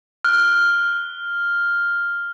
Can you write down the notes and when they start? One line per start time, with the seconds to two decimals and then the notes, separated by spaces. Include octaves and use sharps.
0.25 F6 F#6